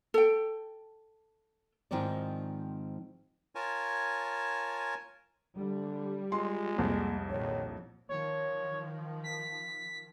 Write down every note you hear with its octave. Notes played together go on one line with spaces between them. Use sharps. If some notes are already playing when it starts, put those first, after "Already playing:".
A4 G5
G#2 D#3 F3 C4 D#4 D5
F4 A#4 C#5 G#5 A5
D3 G3
G#3 F4 C6
C2 F2 A#3
A#1 D#3 C#5
D#3 F3 C#5
B6